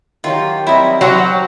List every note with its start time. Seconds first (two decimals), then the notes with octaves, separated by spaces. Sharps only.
0.24 D#3 F#3 F4 G4
0.67 F#3 G3 C4 E4 D#5
1.01 F#3 C5 F#5 G5 B5